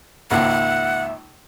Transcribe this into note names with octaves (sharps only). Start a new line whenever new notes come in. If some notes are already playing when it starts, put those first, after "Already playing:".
G#1 C#2 A#3 E5 F#5